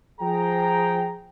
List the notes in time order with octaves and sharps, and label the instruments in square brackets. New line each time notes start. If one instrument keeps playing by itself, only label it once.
[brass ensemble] F3 G#4 G5 A#5